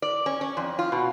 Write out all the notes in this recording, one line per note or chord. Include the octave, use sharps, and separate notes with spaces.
D5
C#4
C#4
F2
F4
B2